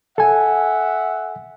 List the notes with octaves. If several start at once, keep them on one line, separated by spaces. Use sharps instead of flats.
A4 E5 F#5 G#5